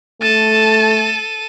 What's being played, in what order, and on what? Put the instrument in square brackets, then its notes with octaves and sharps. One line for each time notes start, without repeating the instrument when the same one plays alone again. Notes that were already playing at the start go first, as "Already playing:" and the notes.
[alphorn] A3 [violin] A4 D#7 [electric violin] A5